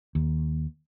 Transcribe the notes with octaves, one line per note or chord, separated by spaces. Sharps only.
D#2